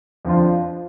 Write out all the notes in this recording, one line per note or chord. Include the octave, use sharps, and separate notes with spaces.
F2 F3 D4 F4